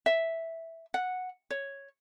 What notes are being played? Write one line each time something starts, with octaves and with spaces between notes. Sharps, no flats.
E5
F#5
C#5